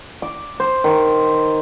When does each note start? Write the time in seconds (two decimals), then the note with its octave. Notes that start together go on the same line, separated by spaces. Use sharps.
0.22 D6
0.60 C5
0.84 D#3